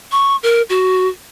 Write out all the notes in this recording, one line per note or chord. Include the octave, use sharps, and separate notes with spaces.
C#6
A#4
F#4